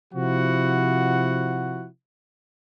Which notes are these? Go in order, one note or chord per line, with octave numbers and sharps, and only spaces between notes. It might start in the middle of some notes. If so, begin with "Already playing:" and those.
C3 F3 E4 F#4 F#5